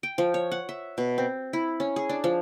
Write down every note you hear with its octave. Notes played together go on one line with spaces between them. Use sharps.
G5
F3
C#5
F#5
E5
B2
C4
E4
C#4
G#4
D4
F3